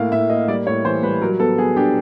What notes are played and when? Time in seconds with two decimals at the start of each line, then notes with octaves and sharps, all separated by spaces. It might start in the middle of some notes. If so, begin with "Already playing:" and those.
Already playing: A2 A#3 F5
0.12 A2 E5
0.30 A#3 D#5
0.48 G3 D5
0.66 A2 C#5
0.85 E3 C5
1.03 G3 B4
1.22 F#3 A#4
1.40 B3 A4
1.58 B3 G#4
1.76 D4 G4